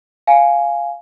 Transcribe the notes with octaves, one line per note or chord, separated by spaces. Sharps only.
F5 G#5